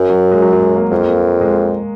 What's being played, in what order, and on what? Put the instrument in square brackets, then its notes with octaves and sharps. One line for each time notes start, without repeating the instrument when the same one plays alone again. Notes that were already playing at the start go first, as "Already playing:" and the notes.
Already playing: [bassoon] F#2
[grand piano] F#3
G#3
F#3
F#3
G#3
A#3
[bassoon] F2 [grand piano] A#3
[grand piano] A#3
G#3